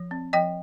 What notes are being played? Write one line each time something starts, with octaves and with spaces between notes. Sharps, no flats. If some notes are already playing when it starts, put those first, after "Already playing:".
Already playing: F3
C4
F3 D#5 G5